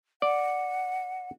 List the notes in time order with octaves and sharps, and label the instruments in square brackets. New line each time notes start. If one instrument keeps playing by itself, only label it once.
[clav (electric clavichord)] D5 [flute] F#5